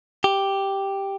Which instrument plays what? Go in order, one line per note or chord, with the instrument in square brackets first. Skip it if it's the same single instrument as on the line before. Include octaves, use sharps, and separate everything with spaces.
[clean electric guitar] G4